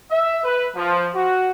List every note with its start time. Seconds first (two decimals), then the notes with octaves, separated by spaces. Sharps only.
0.11 E5
0.43 B4
0.76 F3
1.14 F#4